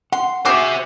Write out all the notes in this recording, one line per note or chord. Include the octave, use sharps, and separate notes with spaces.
F#5 C6
F#4 G#4 C5 E5 D6